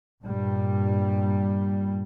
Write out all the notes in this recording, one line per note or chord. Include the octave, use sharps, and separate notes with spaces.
G2 A#2 G3